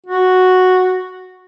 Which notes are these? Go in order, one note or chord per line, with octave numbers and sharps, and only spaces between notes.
F#4